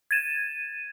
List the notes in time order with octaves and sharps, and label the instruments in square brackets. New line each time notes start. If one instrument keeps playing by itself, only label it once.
[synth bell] G#6 A6 D#7 E7